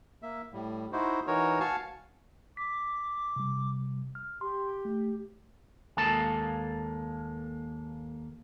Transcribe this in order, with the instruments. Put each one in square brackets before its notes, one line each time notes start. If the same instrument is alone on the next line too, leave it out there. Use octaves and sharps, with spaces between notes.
[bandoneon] A#3 E5
A2 G3
D#4 E4 F#4 C5
E3 D#4 F#4 A#4 C#5
F#4 F5 G#5 A5 C#6
[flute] D6 [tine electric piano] B6
[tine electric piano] C3 G3
F6
[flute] G4 [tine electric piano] C6
[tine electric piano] A3
[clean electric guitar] D#2 G#3 A#3 A4 A5